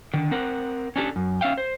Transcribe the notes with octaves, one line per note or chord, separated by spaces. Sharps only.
D3 D#3
C4 A#4 F#5
C#4 D4 G4 A4
F#2
C#4 E5 F5 G5
C5